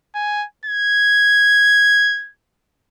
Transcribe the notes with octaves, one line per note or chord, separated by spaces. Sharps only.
G#5
G#6